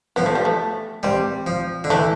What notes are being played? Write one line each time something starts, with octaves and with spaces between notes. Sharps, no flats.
F3 B3
A3
G3
A3
G3 C4
F3
D3
E3 A3